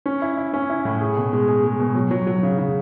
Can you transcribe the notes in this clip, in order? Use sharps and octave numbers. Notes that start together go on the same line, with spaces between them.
C#4
E4
E4
C#4
E4
A2
G#4
B2
G#3
G#4
G#3
B2
F#3
F#3
F#3
C#3
C#3